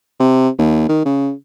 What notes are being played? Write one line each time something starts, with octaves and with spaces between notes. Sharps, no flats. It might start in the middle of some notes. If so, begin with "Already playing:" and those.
C3
D#2
D#3
C#3